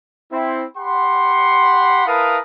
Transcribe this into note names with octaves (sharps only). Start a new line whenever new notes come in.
C4 E4
G4 F#5 B5 C6
E4 A#4 B4 F5 A5 D#6